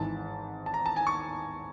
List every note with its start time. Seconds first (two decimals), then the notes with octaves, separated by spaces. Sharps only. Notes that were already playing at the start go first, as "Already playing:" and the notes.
Already playing: G#1 G#2 E3 A5
0.66 A5
0.74 A#5
0.86 A5
0.96 G#5
1.07 C#6